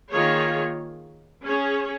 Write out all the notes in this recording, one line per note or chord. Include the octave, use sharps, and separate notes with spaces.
D#3 A#3 F4 G#4 C#5
C#4 G#4 C#5